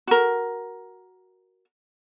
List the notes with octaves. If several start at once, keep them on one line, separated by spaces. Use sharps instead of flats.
F#4 A#4